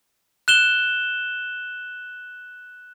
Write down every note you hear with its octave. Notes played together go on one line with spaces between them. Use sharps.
F#6 E7 G7